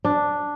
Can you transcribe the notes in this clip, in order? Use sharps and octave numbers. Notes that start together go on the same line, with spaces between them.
D4